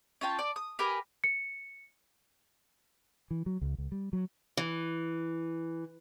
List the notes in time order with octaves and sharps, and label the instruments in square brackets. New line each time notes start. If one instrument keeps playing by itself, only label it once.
[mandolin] C#4 F4 G5 A5
D5
D#6
G4 A#4 B4 G#5
[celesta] C#7
[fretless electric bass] E3
F#3
C#2
C#2
G3
F#3
[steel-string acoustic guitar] E3